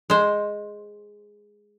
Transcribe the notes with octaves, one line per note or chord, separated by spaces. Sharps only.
G#3 C5